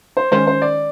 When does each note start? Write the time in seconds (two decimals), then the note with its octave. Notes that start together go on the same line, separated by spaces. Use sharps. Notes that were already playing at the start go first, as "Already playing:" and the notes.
0.17 C5
0.32 D#3 G#3 C#4 C5
0.47 C5
0.62 D5